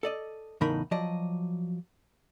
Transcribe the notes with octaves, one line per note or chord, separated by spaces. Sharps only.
A4 D5 D#5
E2 A2 C#3 D#4 A#4 B5
F3 F#3 D5 D#5